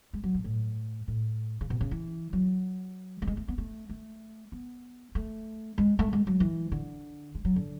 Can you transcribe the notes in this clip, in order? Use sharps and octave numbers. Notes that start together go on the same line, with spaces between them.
G#3
F#3
B2
A2
A2
C#3
B2
C#3
E3
F#3
A3
G#3
A3
B3
A3
A3
B3
A3
G#3
A3
G#3
F#3
E3
D3
G#3
F#3
D3